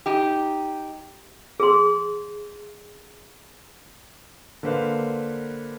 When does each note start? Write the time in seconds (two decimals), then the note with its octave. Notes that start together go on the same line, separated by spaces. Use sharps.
0.06 D#4 G4
1.60 G#4 C6
4.63 D3 A#3 B4 C5 F5